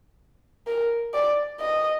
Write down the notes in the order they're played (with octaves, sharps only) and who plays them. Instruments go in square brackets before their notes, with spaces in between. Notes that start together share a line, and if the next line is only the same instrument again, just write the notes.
[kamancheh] A#4
D5
D#5